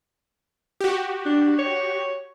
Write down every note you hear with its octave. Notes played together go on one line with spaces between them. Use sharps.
F#4 G4
D4
C#5